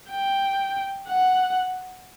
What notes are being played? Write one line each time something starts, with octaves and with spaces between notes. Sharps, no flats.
G5
F#5